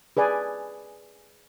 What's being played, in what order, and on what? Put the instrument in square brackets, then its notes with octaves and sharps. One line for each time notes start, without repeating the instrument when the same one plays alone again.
[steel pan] G#4 B4 D5 G#5